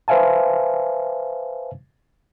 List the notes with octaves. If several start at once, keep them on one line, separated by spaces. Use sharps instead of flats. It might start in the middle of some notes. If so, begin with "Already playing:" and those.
B4 C5 E5 F5 G#5 A5